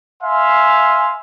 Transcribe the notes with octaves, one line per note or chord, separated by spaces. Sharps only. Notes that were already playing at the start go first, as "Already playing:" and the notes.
E5 F5 G#5 C6